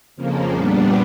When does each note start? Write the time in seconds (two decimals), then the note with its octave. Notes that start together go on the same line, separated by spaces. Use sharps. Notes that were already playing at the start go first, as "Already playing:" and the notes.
0.16 F2 C#3 F3 A#3
0.53 A#2 G3 B3 D4